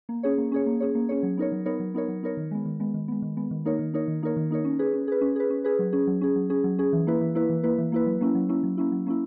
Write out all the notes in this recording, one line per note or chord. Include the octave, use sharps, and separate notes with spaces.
A#3
C#4 G#4 C#5
A#3
C#4 G#4 C#5
A#3
C#4 G#4 C#5
A#3
C#4 G#4 C#5
F#3
B3 D#4 A#4 C#5
F#3
B3 D#4 A#4 C#5
F#3
B3 D#4 A#4 C#5
F#3
B3 D#4 A#4 C#5
D#3
G#3 B3
D#3
G#3 B3
D#3
G#3 B3
D#3
G#3 B3
D#3
A#3 D#4 A#4 C#5
D#3
A#3 D#4 A#4 C#5
D#3
A#3 D#4 A#4 C#5
D#3
A#3 D#4 A#4 C#5
C#4
G#4 B4
C#4
G#4 B4
C#4
G#4 B4
C#4
G#4 B4
F#3
C#4 G#4
F#3
C#4 G#4
F#3
C#4 G#4
F#3
C#4 G#4
E3
A#3 E4 B4
E3
A#3 E4 B4
E3
A#3 E4 B4
E3
A#3 E4 B4
F#3
A#3 C#4 E4
F#3
A#3 C#4 E4
F#3
A#3 C#4 E4
F#3
A#3 C#4 E4